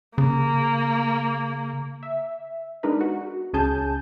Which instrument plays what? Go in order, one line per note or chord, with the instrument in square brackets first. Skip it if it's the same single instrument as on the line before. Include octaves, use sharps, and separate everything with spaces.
[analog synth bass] C#3 [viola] A#3
[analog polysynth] E5
G#3 B3 D4 D#4 A#4 B4
F#4
C#2 C#4 G#4 G#5 A5 G6